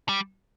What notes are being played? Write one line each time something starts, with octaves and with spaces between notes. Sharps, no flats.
G3